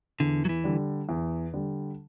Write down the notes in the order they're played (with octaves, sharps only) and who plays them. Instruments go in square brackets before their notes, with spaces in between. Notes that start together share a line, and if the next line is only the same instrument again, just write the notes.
[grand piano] E2 [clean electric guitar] D3
[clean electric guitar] F#3
E3
[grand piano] D3 G3
E2
D3 G3